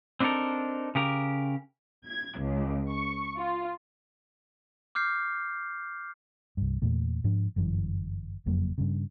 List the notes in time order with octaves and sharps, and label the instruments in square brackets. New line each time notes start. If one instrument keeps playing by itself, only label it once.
[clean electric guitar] C4 D4 D#4 F4 A4 A#4
C#3 G4 A#4
[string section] G#6
C#2
C#6
F4
[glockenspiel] D6 F6 G6 C7
[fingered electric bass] C2 G2
E2 A#2 A3
G#2 F3 D4
G1 F#2 E3
F#1 F2 F#3 A#3
G2 C#3